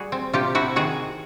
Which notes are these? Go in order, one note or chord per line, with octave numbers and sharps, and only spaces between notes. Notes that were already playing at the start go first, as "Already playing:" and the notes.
Already playing: G3 F#4 G#4
C4
C3 F4 G4
C3 E4 F#4
D#3 F#4 G#4